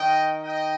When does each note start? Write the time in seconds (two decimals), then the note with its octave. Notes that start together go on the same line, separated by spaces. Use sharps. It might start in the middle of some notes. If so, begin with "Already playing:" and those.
Already playing: D#3 D#5 G5
0.43 D#5 G5